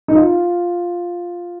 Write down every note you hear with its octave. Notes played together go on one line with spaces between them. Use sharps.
D#4
F4